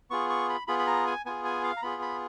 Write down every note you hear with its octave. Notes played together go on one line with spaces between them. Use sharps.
B3 F4 G#4 C#6
C#6
B5
B3 F4 G#4 B5
B5
A#5
G#5
B3 F4 G#4 G#5
G#5
F5
A#5
B3 F4 G#4 B5
B5